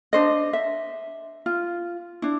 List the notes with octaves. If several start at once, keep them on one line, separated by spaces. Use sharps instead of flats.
D4 C5 D#5
E5
F4
D4 E4